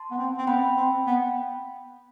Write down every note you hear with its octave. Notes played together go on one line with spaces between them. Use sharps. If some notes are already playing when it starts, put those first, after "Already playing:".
Already playing: A5 C6
B3
C4
C4
B3 G5 B5
C4
B3